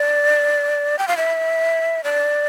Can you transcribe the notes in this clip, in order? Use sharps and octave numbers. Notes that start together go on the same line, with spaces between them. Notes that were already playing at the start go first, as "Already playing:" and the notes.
Already playing: D5
G5
F5
E5
D5